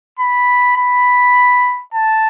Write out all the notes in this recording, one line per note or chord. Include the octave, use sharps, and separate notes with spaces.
B5
B5
A5